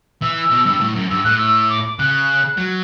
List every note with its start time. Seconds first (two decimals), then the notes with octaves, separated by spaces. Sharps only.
0.22 E3 E6
0.51 B2
0.66 G2
0.81 A2
0.96 F#2
1.10 G2 E6
1.24 A2 F#6
1.38 E6
1.69 D6
1.99 C#3 F#6
2.58 F#3